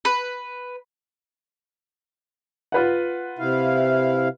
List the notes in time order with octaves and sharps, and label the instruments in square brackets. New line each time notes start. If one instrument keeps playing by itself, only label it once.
[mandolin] B4
[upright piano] F4 B4 F#5
[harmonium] C3 E4 F5